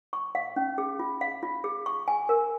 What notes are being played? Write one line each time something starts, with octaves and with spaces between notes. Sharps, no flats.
C#6
F5
C#4
G#4
F4
F5
F4
G#4
C#6
G#5
A#4